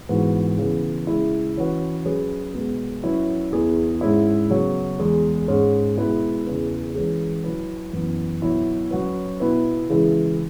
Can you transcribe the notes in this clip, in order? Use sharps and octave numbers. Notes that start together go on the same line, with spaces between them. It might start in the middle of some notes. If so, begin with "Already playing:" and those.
G#2 E3 B3 F#4
C#3 E3 B3
C#3 G#3 E4
E3 C#4 F#4 B4
F#3 C#4 G#4 B4
B2 G#3 B3
F#3 C#4 E4 B4
E2 E3 B3 E4 G#4
G#2 G#3 C#4 E4
C#3 F#3 B3
E2 E3 G#3
G#2 G#3 C#4
B2 G#3 E4 B4
E2 C#3 E3
E3 G#3 C#4 G#4
F#3 E4 B4
F#2 E3 B3
B2 F#3 E4
F#3 C#4 F#4 B4
B2 B3 E4 B4
C#3 E3 G#3 E4